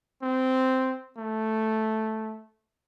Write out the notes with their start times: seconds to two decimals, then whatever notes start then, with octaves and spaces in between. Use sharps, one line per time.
0.23 C4
1.18 A3